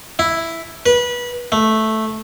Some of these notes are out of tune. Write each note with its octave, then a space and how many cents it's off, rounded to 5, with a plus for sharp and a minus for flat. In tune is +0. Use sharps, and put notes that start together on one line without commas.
E4 +0
B4 -25
A3 -5